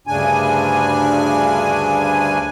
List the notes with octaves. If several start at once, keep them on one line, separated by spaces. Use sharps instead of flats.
D2 G2 C#3 D4 G#5